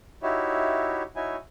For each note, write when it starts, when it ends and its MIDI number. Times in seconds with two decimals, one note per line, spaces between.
0.23 1.03 63
0.23 1.03 64
0.23 1.03 66
0.23 1.03 67
0.23 1.03 73
0.23 1.03 76
1.16 1.36 63
1.16 1.36 64
1.16 1.36 66
1.16 1.36 73
1.16 1.36 76
1.16 1.36 80